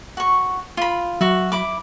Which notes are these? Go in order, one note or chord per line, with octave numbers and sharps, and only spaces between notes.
F#4 C#6
F4 B5
F#3 F#4 E5
E4 B5 D6